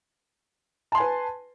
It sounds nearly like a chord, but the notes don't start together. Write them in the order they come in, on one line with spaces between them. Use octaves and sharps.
A5 C6 G#5 B4